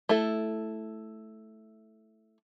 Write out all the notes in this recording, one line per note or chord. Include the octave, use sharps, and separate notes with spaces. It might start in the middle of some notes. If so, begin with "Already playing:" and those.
A3 E4 A4